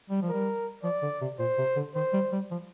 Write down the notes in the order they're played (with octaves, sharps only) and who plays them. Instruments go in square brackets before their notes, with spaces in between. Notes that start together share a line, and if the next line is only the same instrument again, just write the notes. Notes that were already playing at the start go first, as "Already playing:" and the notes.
[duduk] G3
F3
[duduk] G3 [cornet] A#4
[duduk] F3 [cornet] D5
[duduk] D3
C3
[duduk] A#2 [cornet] C5
[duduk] C3
D3
[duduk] D#3 [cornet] C5
[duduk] G3
G3
F3